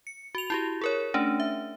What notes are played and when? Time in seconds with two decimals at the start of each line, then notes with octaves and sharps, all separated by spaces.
0.07 C#7
0.35 F#4 F7
0.50 E4 F#4 G4
0.81 G#4 A#4 C#5
1.14 A3 C#4 D4
1.40 E5